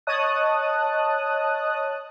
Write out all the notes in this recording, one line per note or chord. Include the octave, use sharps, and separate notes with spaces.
C#5 D#5 A5 D#6 F#6